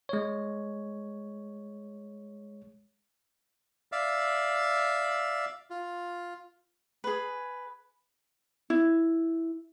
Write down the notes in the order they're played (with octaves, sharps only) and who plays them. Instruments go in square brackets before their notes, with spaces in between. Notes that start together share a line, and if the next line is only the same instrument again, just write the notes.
[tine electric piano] G#3 C#5
[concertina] D5 E5 F5
F4
[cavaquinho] G#4 B4
[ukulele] E4